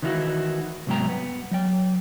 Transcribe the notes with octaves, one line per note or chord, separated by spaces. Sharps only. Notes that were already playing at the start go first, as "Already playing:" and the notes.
D#3 E3 D#4 E4 F#4
C2 G#2 F#3 B3 G5 A#5
B3
F#3 G5